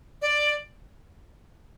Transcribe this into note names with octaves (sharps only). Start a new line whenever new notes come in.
D5